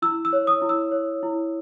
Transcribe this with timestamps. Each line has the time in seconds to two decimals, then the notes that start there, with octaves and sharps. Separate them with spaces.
0.02 E4 E6
0.25 E6
0.33 C#5
0.47 D#6
0.62 E4
0.69 E6
0.92 C#5
1.23 E4